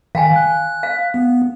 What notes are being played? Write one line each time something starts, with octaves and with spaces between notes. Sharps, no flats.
D#3 F5 G5 G#5
F#6
F5
B3